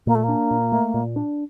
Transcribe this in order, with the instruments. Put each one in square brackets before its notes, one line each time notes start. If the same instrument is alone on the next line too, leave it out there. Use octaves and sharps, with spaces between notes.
[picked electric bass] A#2 [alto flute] A#3
[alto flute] A3
[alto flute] A#3 [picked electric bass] D4
[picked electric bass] A#2
A3
A#2
D4